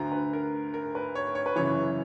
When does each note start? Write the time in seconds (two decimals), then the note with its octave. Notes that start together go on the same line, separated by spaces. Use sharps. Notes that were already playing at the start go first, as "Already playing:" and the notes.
Already playing: D2 D3 A#5
0.12 B4
0.33 A#4
0.74 A#4
0.95 B4
1.15 C#5
1.35 C#5
1.46 B4
1.56 F#2 C#3 E3 C#5